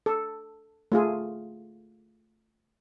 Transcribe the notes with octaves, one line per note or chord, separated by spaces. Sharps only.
A4
A3 F4 G#4